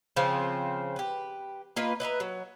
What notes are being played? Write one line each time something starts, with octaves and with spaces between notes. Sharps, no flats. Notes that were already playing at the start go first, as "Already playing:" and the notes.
C#3 F3 C4
G4 B4
A#3 F4 B4 D#5
B4 D#5 E5 A#5
F#3